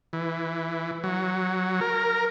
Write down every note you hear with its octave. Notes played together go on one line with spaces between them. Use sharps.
E3
F#3
A#4